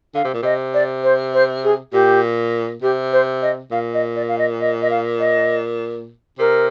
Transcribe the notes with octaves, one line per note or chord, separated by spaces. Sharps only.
D3 F5
C3
A#2
C3 D#5
D5
C5
C5
G#4
A#2 G4
C3 G4
C5
D#5
A#2 F5
D#5
D5
F5
D#5
D#5
D#5
F5
D#5
C3 A#4